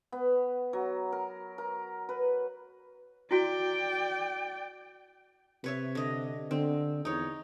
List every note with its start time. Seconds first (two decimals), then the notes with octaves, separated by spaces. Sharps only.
0.12 B3
0.73 F#3
1.12 A#4
1.58 A#4
2.09 B4
3.31 E4 F#4 D5 G5
5.64 C3 B4 C#5 E5
5.95 D3 D#5
6.51 D3 C4
7.05 E2 D#4 C#5